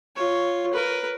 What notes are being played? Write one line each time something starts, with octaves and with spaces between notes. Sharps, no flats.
F4 C#5
A#4 B4